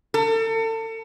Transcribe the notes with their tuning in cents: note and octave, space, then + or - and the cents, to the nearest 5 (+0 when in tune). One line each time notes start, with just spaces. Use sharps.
A4 +35